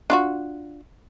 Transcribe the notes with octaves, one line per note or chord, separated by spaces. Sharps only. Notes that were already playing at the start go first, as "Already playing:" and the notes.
D4 F4 F#4